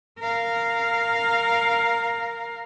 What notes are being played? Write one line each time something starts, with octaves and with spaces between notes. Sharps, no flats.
A#4 F5